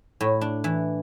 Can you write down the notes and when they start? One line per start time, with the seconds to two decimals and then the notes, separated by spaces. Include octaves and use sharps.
0.21 A2
0.41 D4
0.64 E3